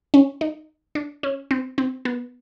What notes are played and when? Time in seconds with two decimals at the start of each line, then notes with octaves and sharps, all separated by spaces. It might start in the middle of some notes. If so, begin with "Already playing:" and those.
0.14 C#4
0.41 D#4
0.95 D4
1.23 C#4
1.51 C4
1.78 C4
2.05 B3